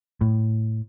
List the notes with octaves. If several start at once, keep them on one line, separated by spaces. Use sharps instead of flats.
A2